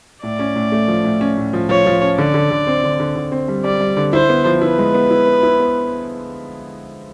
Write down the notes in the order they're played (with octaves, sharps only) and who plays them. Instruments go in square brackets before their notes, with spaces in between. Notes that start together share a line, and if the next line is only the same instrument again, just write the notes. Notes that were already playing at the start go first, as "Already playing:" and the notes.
[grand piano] A2 [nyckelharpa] D5
[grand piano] C#4
A2
A3
F3
A2
C#4
A2
F3
[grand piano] F3 [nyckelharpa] C#5
[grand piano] F3
C#4
[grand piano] D3 [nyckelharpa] D5
[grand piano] D3
D3
C4
D3
D3
D3
C4
G3
[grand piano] G3 [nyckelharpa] D5
[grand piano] G3
D3
[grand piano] E4 [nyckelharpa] C5
[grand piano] B3
F3
[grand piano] E4 [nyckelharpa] B4
[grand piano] G#3
B3
E4
B3
E4
B3